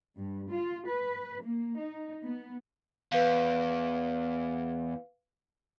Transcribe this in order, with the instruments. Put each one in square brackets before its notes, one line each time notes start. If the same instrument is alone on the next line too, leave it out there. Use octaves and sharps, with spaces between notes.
[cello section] G2
F4
B4
A#3
D#4
B3
[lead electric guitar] E2 [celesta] B4 F5